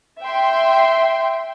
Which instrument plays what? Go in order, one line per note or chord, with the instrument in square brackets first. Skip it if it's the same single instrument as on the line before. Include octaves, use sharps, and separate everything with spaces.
[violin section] E5 G5 C6